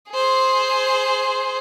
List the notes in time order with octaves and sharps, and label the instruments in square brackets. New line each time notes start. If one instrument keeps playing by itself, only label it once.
[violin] G#4 C5